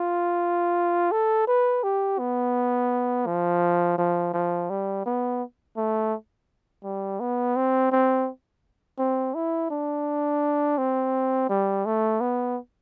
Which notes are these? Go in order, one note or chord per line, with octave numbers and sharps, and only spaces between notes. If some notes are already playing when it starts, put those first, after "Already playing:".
Already playing: F4
A4
B4
G4
B3
F3
F3
F3
G3
B3
A3
G3
B3
C4
C4
C4
E4
D4
C4
G3
A3
B3